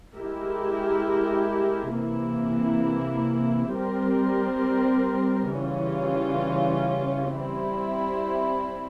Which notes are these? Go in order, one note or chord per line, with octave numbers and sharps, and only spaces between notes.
G#3 E4 G4 A#4
C3 E3 A#3 E4
G3 C4 G4 A#4
C#3 E3 G3 C#4 F4
G3 C4 E4